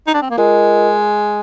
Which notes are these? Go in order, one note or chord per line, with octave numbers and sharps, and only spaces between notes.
D#4
D4
C4
A#3
G#3 F4 A#4 D#5